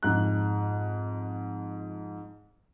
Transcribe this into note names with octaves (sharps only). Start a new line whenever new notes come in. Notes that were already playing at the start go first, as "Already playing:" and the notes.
F2 G#2 F#6